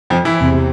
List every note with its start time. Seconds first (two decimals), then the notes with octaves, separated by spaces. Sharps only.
0.10 F2 F3
0.25 E3 E4
0.40 E2 C3